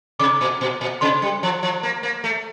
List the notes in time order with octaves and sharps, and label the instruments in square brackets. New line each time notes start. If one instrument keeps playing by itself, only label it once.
[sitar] C3 [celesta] D6
[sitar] A#2
A#2
A#2
[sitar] C3 [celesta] C6
[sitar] G3
F3
F3
A#3
A#3
A3